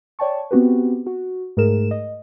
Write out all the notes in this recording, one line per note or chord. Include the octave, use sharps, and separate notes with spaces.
C#5 D5 G5 A5 C#6
B3 C4 F#4 G4 B4
F#4
G#2 A3 G#4 A#4 E7
D#5